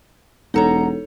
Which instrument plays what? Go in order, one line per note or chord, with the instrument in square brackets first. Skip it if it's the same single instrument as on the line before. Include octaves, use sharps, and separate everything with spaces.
[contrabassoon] E1 [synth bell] D#4 A4 C#5 [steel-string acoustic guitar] D#5 F#5 A#5